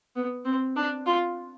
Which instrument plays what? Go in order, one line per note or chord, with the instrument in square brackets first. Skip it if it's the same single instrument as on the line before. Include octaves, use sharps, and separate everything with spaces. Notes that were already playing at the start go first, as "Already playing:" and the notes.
[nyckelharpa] B3
C4
D4
F4